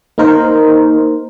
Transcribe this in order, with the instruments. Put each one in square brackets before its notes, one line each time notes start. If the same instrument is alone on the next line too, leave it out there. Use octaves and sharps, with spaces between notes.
[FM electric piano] A#3 D#4 A#4 C5